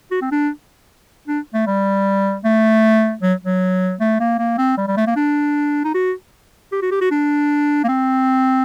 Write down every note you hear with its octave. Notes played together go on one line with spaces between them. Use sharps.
F#4
C4
D4
D4
A3
G3
A3
F#3
F#3
A3
A#3
A#3
C4
G3
G3
A3
A#3
D4
D#4
F#4
G4
F#4
G4
F#4
D4
A#3
C4